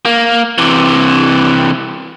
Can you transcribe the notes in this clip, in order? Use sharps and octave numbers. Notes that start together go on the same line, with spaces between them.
A#3
C3 E3